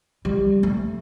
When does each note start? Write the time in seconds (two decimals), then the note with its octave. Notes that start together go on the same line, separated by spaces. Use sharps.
0.25 G3
0.63 A3